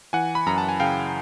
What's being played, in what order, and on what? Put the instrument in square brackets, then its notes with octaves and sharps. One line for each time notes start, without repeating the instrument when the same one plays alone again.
[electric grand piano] E3 F#5 G#5
B5
F#2 A#5
A5
G#5
C#3 F5 G5